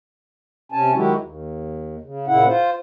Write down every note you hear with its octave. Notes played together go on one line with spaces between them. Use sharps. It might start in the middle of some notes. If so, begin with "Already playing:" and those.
C3 C#4 G#5 A5
D#3 F#3 G#3 E4 F#4 G4
D#2
C#3
A#2 C#3 E4 F#5
F4 C5